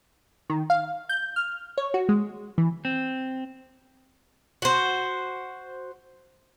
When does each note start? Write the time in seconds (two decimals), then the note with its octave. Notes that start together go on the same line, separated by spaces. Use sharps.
0.50 D#3
0.70 F5
1.09 G6
1.36 F6
1.78 C#5
1.94 F#4
2.09 G#3
2.58 E3
2.85 C4
4.62 F#4 C5